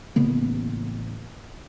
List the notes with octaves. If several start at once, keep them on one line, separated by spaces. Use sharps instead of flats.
A1 C#3 A#3 B3